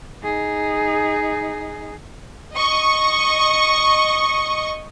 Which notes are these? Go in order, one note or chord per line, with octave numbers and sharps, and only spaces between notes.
D#4 G#4
D#5 C#6